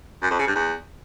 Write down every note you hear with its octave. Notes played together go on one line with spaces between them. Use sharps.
F#2
F2
C#3
G2
E2